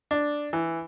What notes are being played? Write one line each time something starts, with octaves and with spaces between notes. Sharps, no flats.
D4
E3